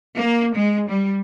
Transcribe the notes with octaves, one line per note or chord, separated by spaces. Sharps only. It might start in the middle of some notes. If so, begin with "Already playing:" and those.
A#3
G#3
G3